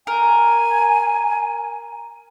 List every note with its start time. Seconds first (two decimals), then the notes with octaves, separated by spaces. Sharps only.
0.07 A#4 G#5